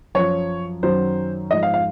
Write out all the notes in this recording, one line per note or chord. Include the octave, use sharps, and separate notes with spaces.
F#2 F3 C#5
F#2 D#3 F#3 C5
G#2 F3 D#5
F5
F5